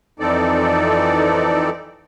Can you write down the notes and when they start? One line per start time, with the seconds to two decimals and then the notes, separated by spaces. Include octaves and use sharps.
0.20 F2 E3 C4 D#4 A4 D5